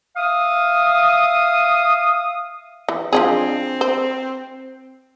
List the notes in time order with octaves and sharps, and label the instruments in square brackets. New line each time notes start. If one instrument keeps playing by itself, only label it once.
[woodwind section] E5 F5 D#6
[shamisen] E3
[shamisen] F3 D4 G#4 [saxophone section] C4
[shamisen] C5